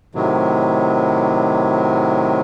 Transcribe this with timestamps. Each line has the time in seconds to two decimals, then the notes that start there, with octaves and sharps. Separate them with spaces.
0.15 A2 C3 D#3 F#3